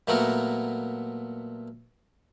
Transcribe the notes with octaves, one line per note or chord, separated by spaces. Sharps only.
A#2 F#3 A3 B3 F#4 A#4